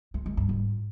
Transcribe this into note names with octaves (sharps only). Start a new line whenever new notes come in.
G#3
G#3
G2
G#2